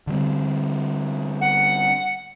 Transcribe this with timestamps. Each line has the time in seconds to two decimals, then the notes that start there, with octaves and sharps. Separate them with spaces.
0.07 D3 G3 C4
1.41 F#5